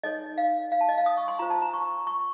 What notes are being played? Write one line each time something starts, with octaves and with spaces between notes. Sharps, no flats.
D#4 A4 C#5 D#5
F5
F5
A5
D#5
F5
D#6
C#6
C6
F4 C5 A#5
A5
A#5
C#6
C#6